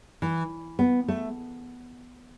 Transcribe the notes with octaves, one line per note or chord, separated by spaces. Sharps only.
E3
B3
A3